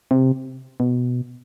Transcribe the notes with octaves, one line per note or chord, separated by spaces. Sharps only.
C3
B2